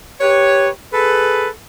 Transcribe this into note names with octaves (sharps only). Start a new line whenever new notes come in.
G4 B4 C#5
G#4 A4 B4